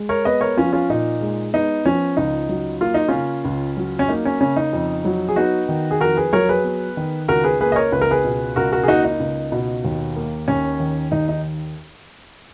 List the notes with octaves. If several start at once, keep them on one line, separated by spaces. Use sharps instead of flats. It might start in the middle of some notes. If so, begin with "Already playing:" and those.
Already playing: G#3
A#4 C#5
B3 B4 D#5
A#4 C#5
F3 C#4 F4
C#4 F4
A#2 D#4
G#3
B3 D#4
F3 C#4
C#2 D#4
F#3
A#3 F4
D#4
C#3 C#4 F4
C#2
F#3
C#4
A#3 D#4
C#4
C#3 C#4
D#4
F2
F#3
G#4
B3 D#4 F#4
D#3
G#4
F2 F#4 A#4
G#4 B4
F#3 A#4 C#5
G#4 B4
B3
D#3
C#2 F#4 A#4
G#4 B4
A#3 G#4 B4
D#5
A#4 C#5
C#2 B4
A#4
G#4 B4
B2
C#2 F#4 A#4
F#4 A#4
G#4
A#3 D#4 F#4
D#4
C#2
B2
D#2
A#3
D#2 C#4
D#3
D#2 D#4
D#4